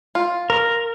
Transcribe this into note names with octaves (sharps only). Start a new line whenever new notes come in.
F4
A#4